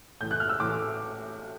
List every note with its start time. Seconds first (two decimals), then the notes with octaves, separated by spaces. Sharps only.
0.21 A2 E3 G6
0.31 F#6
0.40 F6
0.49 E6
0.59 A2 E3 D6